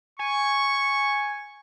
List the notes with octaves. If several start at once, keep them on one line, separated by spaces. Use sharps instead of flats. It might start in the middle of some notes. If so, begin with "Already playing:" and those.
G#5 C#6